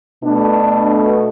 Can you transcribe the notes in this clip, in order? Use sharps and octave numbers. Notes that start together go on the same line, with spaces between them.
B2 A3 D4